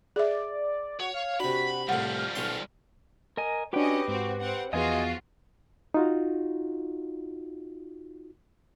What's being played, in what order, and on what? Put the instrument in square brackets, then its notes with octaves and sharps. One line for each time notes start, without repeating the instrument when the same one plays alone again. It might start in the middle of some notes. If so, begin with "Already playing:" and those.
[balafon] G#4 E5 [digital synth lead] D5
[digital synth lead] F#4 [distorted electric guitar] C#5
[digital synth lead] F5
[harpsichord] C3 D4 [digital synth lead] F#4 [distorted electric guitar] B5
[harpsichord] C2 A2 [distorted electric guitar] F3 G3 [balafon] F#5 [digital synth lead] F6
[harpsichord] B1 C#4 C6
[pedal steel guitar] A#4 D#5 G#5
[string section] C#4 D#5 [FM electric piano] D4 F#4 [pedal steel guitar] G4 B4 G5
[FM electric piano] G#2 [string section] C4 F#4
[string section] C4 F#5
[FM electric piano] E2 B3 G#4 [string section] F3 F4 F#4 [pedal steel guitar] D#5 G#5
[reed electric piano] D#4 F4 F#4